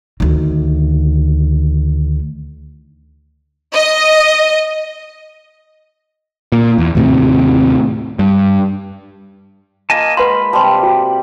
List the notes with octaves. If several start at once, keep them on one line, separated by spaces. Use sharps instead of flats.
D2 D#3
D#5
A#2
E2
D#2 A2 C3
G2
A#3 F4 D#5 G#5 A5
G#3 B4 F#5 B5 C6
C3 G3 A5 C6
F#4